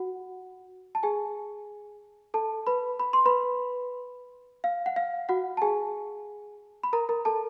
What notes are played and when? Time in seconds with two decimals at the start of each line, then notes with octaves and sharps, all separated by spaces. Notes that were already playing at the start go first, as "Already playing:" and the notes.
Already playing: F#4 F#5
0.95 A5
1.03 G#4 G#5
2.34 A4 A5
2.67 B4 B5
3.00 B5
3.13 C6
3.26 B4 B5
4.64 F5
4.86 F#5
4.96 F5
5.29 F#4 F#5
5.57 A5
5.62 G#4 G#5
6.83 B5
6.93 A#4 A#5
7.09 A#4 A#5
7.25 A4 A5